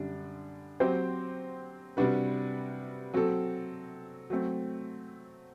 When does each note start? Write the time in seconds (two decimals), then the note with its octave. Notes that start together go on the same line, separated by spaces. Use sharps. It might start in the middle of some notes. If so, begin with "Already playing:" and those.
Already playing: F#2 D3 G3 D4
0.80 F#3 C4 G4 C5
1.97 C3 G3 D4 F#4 B4
3.14 F#3 C4 F#4 A4
4.30 F#3 A3 C4